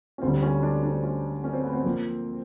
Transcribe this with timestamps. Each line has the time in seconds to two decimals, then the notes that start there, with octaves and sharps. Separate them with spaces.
0.18 C#4
0.22 D2 D3 G3 C4
0.43 C#4
0.63 D4
0.83 D4
1.03 C#4
1.44 C#4
1.53 C4
1.63 B3
1.73 C4
1.84 F3 A#3